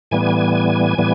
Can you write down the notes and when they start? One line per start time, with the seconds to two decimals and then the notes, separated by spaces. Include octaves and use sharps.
0.11 A2 E3 G3 B3 G#5
0.98 A2 E3 G3 B3